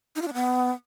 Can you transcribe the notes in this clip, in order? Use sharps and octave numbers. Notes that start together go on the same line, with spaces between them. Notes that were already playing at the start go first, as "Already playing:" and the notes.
D#4
F4
D4
B3